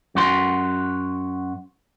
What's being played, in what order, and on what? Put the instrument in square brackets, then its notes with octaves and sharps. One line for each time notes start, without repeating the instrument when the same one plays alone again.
[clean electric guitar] F#2 F#4 C6